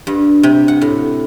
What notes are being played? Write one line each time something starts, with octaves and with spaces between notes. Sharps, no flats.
G2
C3
F#5
A2